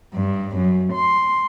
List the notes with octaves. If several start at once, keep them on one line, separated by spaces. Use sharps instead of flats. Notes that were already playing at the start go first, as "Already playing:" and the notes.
G2
F#2
C6